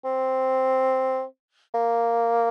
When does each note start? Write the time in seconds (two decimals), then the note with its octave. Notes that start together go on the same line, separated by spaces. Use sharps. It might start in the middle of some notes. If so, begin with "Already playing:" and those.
0.04 C4
1.74 A#3